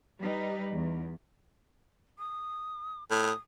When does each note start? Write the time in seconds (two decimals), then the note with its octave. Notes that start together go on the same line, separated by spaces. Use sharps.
0.20 G3 D#4 B4
0.71 E2
2.19 D#6
3.11 A2 D#6